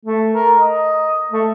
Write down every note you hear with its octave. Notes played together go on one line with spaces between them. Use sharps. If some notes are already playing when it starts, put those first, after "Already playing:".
A3
A#4
D#5
A3